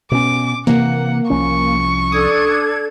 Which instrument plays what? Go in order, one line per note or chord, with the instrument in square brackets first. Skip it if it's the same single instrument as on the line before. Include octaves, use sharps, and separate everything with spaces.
[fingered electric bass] B2 B3 C#4 [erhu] D6
[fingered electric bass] C3 E3 [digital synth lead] A#3 [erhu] F#5
[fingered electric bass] C2 F3 C#4 [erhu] C#6
[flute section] D4 A4 G#6 [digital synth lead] D#6